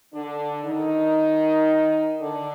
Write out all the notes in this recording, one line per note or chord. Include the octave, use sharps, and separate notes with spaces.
D3 D4
D#3 D#4
D3 D4